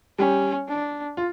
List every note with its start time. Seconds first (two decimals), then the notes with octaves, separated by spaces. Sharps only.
0.19 G3 C#4 G4
0.68 D4
1.17 F4